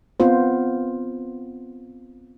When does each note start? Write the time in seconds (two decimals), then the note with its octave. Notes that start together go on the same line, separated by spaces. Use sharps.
0.20 B3 C4 F4 C5